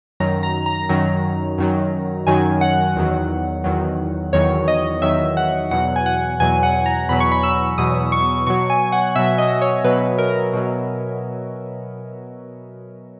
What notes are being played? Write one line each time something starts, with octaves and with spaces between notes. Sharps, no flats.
F#2 D#3 F#3 A#5
A#5
A#5
F#2 D#3 F#3
F#2 D#3 F#3
F#2 D#3 F#3 G#5
F#5
E2 D#3 F#3
E2 D#3 F#3
E2 D#3 F#3 C#5
D#5
E2 D#3 F#3 E5
F#5
E2 B2 F#3 F#5
G#5
F#5
E2 B2 F#3 G#5
F#5
A#5
E2 B2 F#3 B5
C#6
B5
E6
E2 B2 F#3 D#6
C#6
B2 F#3 C#6
G#5
F#5
B2 F#3 E5
D#5
C#5
B2 F#3 B4
A#4
B2 F#3